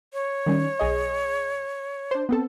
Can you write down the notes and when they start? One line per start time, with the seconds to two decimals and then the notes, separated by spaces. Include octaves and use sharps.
0.14 C#5
0.46 D#3 G3 C#4
0.79 B1 G#4 D#5
2.11 D4 C5
2.29 B3 C4 A4